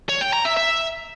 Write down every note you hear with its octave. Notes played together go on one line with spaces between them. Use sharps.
C#5
G5
A#5
E5
E5